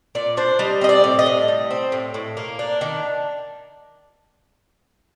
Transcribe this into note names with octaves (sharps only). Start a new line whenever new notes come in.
A#2 D5
D4 C5
G3 D#5
C4 D#5
D5
A2
D#5
A2
G3
C4
A2
A2
A#3
D4
D#3